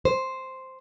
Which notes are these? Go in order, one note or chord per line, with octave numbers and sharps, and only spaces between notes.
C5